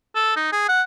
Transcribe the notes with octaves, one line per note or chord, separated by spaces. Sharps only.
A4
D#4
G#4
F#5